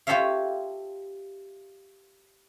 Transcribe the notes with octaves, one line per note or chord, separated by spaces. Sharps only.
F4 G4 A4 C#5 E5 F5